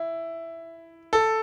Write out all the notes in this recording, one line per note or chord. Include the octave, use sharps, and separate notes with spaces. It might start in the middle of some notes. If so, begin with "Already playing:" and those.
Already playing: E4
A4